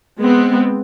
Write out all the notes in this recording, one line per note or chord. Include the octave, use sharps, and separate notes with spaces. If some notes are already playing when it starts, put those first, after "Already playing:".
G#3 B3 C4